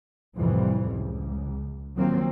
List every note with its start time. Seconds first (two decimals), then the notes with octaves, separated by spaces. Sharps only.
0.37 C2 F2 A2 C3 E3 G3
0.89 C#2
1.97 D#3 F3 F#3 A#3 C4